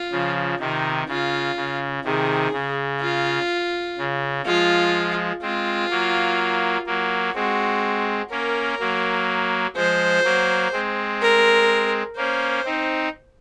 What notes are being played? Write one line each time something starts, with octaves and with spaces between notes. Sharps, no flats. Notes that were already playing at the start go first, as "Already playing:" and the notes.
Already playing: F4
C#3 F3
C3 D#3 D#4
C#3 F4
C#3
C3 D#3 G#4
C#3
F4
C#3
F3 G#3 F4
G#3 C4 F4
F#3 A#3
F#3 A#3
G#3 C4 F#4
A#3 C#4 A#4
F#3 A#3
F3 G#3 C5
F#3 A#3
G#3 C4
A#4
A#3 C#4 C5
C4 D#4